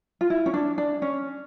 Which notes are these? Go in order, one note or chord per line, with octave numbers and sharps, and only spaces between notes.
F4
E4
C#4
D4
D4
C#4